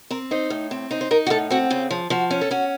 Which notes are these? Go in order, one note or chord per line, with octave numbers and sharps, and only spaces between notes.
C4 A#4
D#4 C5
A2
C4
D#4 C5
C5
D#4 A#4
F#4
A2 A4
C4 F#4
C#3 F4
F3
F3 F#4
C#4
A4
C#4 F#4